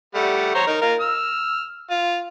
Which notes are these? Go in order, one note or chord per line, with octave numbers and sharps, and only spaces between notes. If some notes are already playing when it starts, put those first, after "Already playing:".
G3 A3 F#5
C5 C#5 A#5
D#4 A#4
F4 A#4
E6 F6
F4